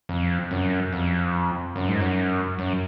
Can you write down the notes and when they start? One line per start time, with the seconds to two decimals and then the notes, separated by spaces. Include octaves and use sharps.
0.09 F2
0.51 F#2
0.93 F2
1.76 F#2
1.88 G#2
2.00 F#2
2.59 F#2